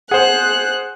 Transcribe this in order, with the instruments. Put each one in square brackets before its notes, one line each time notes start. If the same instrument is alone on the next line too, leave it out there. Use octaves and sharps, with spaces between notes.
[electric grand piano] G#4 C5 [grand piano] F#5 [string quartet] F#6